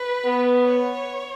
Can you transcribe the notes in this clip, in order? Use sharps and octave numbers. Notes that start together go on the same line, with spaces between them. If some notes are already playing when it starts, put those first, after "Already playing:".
Already playing: B4
B3
C#5